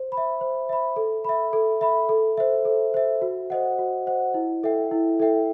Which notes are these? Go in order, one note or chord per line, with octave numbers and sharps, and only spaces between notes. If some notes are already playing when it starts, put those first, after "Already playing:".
Already playing: C5
B5
E5
C5
E5 B5
A4
E5 B5
A4
E5 B5
A4
C5 E5
A4
C5 E5
F#4
C5 D#5 F#5
F#4
C5 D#5 F#5
E4
A4 E5 G5
E4
A4 E5 G5